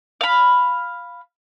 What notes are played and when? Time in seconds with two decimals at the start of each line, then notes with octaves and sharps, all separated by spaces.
0.21 F5 B5